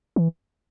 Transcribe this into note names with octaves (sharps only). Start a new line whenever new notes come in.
E3